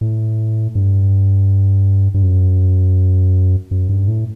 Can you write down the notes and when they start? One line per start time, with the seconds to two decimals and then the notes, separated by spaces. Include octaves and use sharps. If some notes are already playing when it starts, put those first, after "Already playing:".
0.01 A2
0.75 G2
2.14 G2
2.23 F#2
3.71 F#2
3.89 G2
4.08 A2